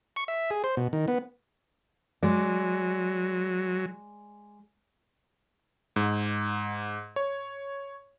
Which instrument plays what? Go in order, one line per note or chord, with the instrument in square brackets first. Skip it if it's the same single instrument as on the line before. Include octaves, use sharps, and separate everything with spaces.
[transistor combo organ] C#6
E5
G#4
C5
B2
D#3
B3
[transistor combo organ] F#3 [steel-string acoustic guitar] G#3 D5
[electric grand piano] G#2
C#5